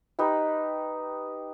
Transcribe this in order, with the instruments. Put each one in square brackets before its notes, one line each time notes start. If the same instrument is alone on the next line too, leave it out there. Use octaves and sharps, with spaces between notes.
[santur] D#4 G4 B4 B5